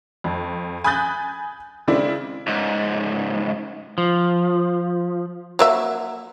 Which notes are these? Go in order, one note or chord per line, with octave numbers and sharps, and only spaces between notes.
F2
G#5 B5 D#6 F#6 G6 A6
C#3 G#3 C4 D4 E4
C#2 G#2
F3
F#3 A#3 E5